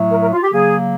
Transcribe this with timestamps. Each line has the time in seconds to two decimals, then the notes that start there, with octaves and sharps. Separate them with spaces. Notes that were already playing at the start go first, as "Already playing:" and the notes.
Already playing: A2 F#3 A3
0.11 A#4
0.22 A#4
0.32 F4
0.43 G4
0.52 C#3 F#3 A#3 G#4